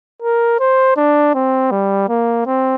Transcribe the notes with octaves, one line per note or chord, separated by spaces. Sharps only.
A#4
C5
D4
C4
G3
A#3
C4